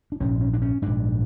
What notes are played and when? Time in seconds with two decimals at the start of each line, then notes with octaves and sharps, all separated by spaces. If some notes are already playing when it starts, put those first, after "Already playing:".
0.12 D4
0.20 A#1 G#2 C#4
0.41 C#4
0.53 D4
0.62 C#4
0.82 A#1 G#2 D4